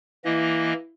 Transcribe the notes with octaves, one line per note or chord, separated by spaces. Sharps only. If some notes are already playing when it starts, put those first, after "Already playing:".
E3 A#3 E4 D#5